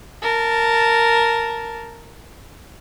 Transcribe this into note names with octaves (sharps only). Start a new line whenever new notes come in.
A#4 A5